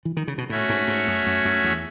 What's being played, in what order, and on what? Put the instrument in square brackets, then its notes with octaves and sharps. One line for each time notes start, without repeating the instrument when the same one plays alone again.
[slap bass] E3
D#3
C#3
B2
[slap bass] A2 [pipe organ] A3 C#4 F#4 C#5 E5
[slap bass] G#2
G#2
F#2
F#2
F#2
E2